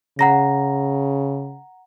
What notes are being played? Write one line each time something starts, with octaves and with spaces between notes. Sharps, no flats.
C#3 F#5 A#5 A#6